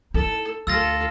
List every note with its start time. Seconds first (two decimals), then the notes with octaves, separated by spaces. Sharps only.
0.14 D#4 E4 A4
0.67 D2 F4 A4 E6 A6 A#6